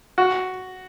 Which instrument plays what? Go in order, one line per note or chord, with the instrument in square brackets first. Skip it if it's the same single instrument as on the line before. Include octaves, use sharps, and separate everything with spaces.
[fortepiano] F#4